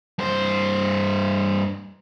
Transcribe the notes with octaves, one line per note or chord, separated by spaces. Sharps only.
G2 C5